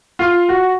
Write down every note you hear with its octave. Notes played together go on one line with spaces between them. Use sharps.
F4
F#4